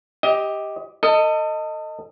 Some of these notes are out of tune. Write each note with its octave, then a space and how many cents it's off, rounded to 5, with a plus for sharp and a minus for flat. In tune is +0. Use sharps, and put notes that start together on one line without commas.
G4 +5 D#5 +25
A4 +35 D#5 +0